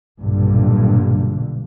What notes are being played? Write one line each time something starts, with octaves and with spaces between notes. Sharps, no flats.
B1 G2 A#2 D3